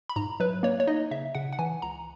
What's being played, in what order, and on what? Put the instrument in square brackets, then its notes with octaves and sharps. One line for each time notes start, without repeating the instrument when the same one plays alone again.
[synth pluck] B5
G#2 A#5
F#3 B4
A#3 C#5
C#5
D#4 D#5
C#3 E5
C#3 F#5
F#5
E3 G#5
C#2 A#5